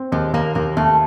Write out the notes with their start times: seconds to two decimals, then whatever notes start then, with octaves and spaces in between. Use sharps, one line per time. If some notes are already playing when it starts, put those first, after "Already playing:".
Already playing: C4
0.12 D#2 G#3
0.33 D#2 A#3
0.55 D#2 A#3
0.77 D#2 A3